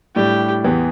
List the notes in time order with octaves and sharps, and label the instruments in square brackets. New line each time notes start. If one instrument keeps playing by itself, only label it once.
[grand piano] A2 G3 D4 [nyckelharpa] G4
[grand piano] E2 E3 B3 G4